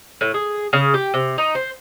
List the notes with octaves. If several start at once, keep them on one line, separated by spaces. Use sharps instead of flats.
A2
G#4
C#3
G4
C3
D#4
C5